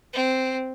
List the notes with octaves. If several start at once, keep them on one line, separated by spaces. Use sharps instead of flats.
C4